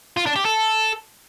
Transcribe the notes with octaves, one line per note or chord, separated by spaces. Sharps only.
F4
D4
G4
A4